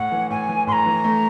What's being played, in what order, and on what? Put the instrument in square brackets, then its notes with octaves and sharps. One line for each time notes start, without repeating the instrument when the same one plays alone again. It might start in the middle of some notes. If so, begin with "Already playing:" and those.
Already playing: [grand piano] A2 [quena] F#5
[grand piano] E3
[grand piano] A2 [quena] G#5
[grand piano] E3
[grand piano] A2 [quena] C6
[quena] A#5
[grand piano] E3
A3